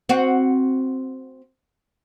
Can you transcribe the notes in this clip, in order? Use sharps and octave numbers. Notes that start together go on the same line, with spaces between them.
C4 F#4